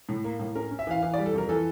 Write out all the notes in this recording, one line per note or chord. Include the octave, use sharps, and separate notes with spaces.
A2
A#3
A2
C#4 A#4
C#4
E5
E3 F5
E3 F5
D5
G3
A4
F2 A#4
E3 A4